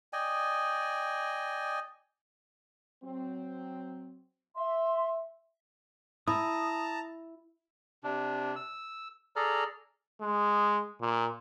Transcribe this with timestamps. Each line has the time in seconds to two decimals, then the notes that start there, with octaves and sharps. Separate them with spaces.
0.13 D5 D#5 G5 G#5
3.04 F#3 C4
4.56 E5 C6
6.28 E4 A5 A#5 D#6
8.04 C3 D4
8.56 E6
9.36 G#4 A4 D5 A#5 F6
10.21 G#3
11.01 A#2